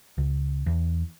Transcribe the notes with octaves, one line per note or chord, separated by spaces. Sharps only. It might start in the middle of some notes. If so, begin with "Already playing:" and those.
C#2
E2